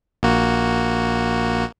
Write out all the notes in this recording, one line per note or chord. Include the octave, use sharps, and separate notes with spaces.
A#1 A#3 F#4